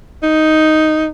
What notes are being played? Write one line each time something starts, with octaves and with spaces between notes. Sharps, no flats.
D#4